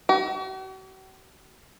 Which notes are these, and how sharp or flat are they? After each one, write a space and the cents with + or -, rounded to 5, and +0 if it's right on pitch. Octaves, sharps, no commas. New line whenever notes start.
F#4 +45